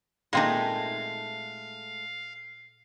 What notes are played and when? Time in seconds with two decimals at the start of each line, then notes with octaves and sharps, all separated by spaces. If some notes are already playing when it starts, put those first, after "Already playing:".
0.33 A#2 G#3 A3 C4 D#4 F5